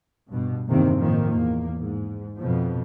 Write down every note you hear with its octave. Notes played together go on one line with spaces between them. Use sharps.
G2 B2
E2 G2 C3 D#3 A#3 C4
A2 D#3 F3 A#3
E2 A#3
G#2
F2 B2 F3